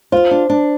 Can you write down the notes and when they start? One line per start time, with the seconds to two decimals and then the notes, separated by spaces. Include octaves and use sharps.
0.12 F4 C5
0.31 D4
0.50 D4